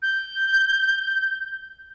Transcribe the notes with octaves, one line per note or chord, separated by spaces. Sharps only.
G6